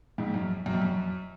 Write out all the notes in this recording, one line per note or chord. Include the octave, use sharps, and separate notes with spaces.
F2 G#2
F#2
F#2
F2
F#2